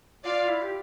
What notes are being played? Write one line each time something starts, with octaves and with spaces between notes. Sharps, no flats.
F4 D5 F5
E4
G4